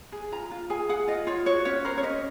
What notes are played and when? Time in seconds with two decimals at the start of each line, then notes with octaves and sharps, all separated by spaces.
0.12 G#4
0.32 F4 A#5
0.51 F4
0.70 G#4 G#5
0.89 G#4 F#5
1.08 F4 D#5
1.27 F4 C#5
1.46 F#4 C#5
1.65 C#4 C#5
1.85 A#4 C5
1.98 C#5
2.03 C#4 D#5